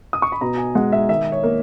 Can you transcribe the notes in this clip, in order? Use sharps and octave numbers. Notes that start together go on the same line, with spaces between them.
D#6
C#6
B5
B2 A#5
G#5
G#3 F#5
E5
D#3 E5
C#5
A#3